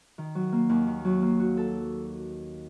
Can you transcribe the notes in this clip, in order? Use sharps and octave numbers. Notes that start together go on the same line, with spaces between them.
D#3
F#3
A#3
D#2
D#3
F#3
A#3
F#4
A4